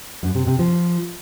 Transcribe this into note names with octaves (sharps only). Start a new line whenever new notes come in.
F#2
C3
C3
F3